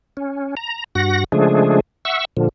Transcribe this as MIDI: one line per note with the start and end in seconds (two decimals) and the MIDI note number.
0.17 0.55 61
0.57 0.84 82
0.95 1.24 43
0.95 1.24 66
0.95 1.24 78
0.95 1.24 94
1.32 1.80 49
1.32 1.80 53
1.32 1.80 56
1.32 1.80 57
1.32 1.80 62
1.32 1.80 68
2.05 2.25 76
2.05 2.25 78
2.05 2.25 85
2.05 2.25 88
2.37 2.49 46
2.37 2.49 50
2.37 2.49 53